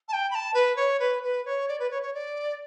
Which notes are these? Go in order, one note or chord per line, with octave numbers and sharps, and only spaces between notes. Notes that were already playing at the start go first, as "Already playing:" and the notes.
A5
G5
B5
A5
B4
C#5
B4
B4
C#5
D5
B4
C#5
C#5
D5